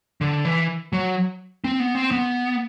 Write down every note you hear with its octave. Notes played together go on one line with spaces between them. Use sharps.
D3
E3
F#3
C4
B3
C4
B3